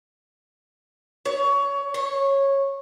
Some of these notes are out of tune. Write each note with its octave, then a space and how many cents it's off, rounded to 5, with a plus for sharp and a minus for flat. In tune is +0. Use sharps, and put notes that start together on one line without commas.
C#5 +25
C#5 -10